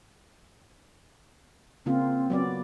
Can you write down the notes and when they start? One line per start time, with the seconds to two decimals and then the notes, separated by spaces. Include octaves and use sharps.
1.86 C#3 A#3 C4 F4
2.30 F#3 B3 D5